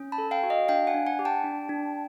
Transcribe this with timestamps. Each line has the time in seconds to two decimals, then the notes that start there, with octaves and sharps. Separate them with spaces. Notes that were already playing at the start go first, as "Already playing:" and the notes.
Already playing: C#4
0.12 A5 B5
0.18 A4
0.31 F5 G5
0.43 F#4
0.50 D#5 F5
0.68 D4 F5 G5
0.87 F#5 G#5
0.94 D4
1.06 F#5 G#5
1.19 G4
1.25 G5 A5
1.44 D4
1.69 D4